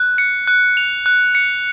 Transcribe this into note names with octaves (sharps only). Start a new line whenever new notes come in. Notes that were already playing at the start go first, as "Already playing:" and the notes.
Already playing: F#6
C#7
F#6
F7
F#6
C#7